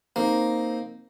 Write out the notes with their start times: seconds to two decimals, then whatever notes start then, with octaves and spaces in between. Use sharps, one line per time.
0.16 A#3 C4 D#4